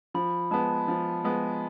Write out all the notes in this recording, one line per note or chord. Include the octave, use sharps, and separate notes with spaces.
F3 B5
G#3 B3 A5
F3
G#3 B3